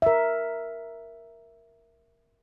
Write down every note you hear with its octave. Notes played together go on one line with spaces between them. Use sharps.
A#4 E5